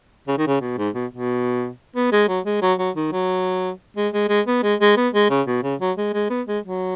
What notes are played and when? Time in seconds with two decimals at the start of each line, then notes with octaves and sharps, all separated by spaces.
0.27 C#3
0.38 D#3
0.47 C#3
0.61 B2
0.78 G#2
0.94 B2
1.11 B2
1.95 B3
2.12 G#3
2.28 F#3
2.45 G#3
2.62 F#3
2.78 F#3
2.96 D#3
3.12 F#3
3.97 G#3
4.13 G#3
4.29 G#3
4.47 B3
4.63 G#3
4.80 G#3
4.97 B3
5.14 G#3
5.30 C#3
5.47 B2
5.63 C#3
5.80 F#3
5.97 G#3
6.13 G#3
6.30 B3
6.47 G#3
6.64 F#3